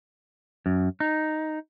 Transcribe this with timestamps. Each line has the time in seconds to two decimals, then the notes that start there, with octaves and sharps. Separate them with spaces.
0.66 F#2
1.00 D#4